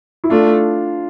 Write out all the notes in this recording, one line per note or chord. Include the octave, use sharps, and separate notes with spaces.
E4
A3 D4 F4